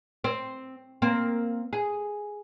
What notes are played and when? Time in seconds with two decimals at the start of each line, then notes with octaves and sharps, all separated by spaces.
0.24 C4
1.02 A#3 C4
1.73 G#4